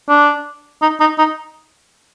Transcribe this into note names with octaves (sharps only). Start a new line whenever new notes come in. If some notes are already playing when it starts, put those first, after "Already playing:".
D4
D#4
D#4
D#4